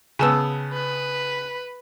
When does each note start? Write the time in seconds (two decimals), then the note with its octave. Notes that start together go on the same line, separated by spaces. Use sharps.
0.19 C#3 B3 G#5 A5 E6
0.74 B4